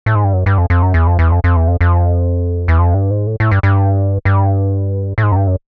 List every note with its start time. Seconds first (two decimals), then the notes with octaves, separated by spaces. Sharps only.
0.06 A2
0.15 G#2
0.24 G2
0.33 F#2
0.46 G2
0.58 F2
0.70 F2
0.82 F#2
0.94 E2
1.07 F2
1.19 E2
1.32 F2
1.44 F2
1.56 E2
1.67 F2
1.81 F2
2.68 E2
2.79 F2
2.94 G2
3.11 G#2
3.27 A2
3.40 A2
3.51 G2
3.63 G2
4.25 G2
5.18 A2
5.23 G#2
5.32 F#2
5.36 G2
5.47 F#2